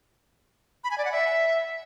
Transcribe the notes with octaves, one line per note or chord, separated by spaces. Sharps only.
B5
G#5
D5
F#5
E5